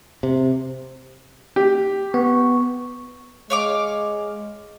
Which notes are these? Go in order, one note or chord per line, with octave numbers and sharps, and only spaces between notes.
C3
G4
B3 C#6
G#3 C#5 F5 D6